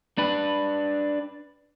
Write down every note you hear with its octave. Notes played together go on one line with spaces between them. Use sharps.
D4 B4